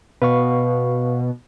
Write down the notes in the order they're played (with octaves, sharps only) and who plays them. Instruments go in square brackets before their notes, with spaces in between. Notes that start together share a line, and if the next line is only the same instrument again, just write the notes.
[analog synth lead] B2 [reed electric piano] B4 F5 C#6